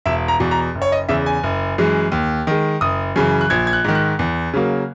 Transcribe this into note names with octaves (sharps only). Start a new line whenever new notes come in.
E1 E5
A#5
E2 B2
A#5
F#1
C#5
D#5
E2 C#3 E5
G#5
F#1
F#2 E3 G#3
D#2
D#3 G#3
F#1 D#6
F#2 C#3 E3
F#6
A#1 G#6
G#6
F#6
G#2 D#3
F#6
E2
C#3 F#3 A#3